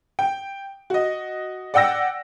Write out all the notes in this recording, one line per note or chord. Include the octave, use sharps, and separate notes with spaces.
G5
F#4 D#5
D5 F#5 G5 E6 A#6